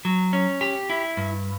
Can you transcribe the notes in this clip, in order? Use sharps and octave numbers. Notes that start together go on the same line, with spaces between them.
F#3
C#4
G4
E4
G2